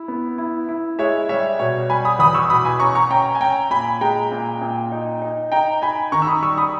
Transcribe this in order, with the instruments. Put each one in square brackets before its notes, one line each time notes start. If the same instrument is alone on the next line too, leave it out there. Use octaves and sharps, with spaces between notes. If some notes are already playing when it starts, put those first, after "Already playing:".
Already playing: [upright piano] E4
B3
E4
E4
G#3 C#5 E5
G3 C#5 E5
B2 C#5
G3 G#5 B5
B5 D#6
E2 B5 D#6
C#6 E6
B2 B5 D#6
G#5 B5
C#4 A#5 C#6
A#5 C#6
C#4 G5 A#5
G#5
C#4 G5 A#5
A#2 G#5 B5
G#3 G5 A#5
A#2
A#2
D#4
D#4
D#4 G5 A#5
D#4 G#5 B5
D#3 A#5 C#6
E6
B5 D#6
G3 C#6 E6
B5 D#6